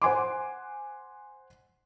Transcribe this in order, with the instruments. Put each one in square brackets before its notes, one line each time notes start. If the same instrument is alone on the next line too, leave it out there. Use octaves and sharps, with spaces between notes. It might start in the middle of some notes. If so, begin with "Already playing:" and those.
[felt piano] C5 F#5 G#5 C6 D6